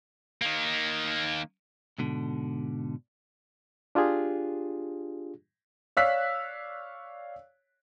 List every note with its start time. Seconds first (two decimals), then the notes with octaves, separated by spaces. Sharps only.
0.42 D#3 A#3
1.98 G#2 B2 D3
3.95 D4 F4 G4 G#4
5.97 C#5 D5 F5 E6 F#6 B6